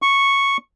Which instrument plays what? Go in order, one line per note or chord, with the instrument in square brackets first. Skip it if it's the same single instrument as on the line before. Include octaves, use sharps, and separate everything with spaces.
[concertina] C#6